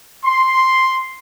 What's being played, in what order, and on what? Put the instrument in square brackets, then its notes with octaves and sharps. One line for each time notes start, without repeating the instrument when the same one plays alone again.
[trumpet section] C6